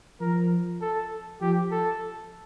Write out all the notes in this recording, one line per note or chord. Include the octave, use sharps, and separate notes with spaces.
F3 A#4
A4
F3 G4
A4